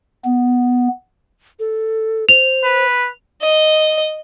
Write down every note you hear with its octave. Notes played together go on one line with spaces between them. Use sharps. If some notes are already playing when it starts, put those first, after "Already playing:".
B3
A4
C5 F7
B4
D#5